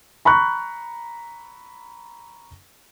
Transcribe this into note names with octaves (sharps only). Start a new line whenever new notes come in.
A#5 B5 C#6 F#6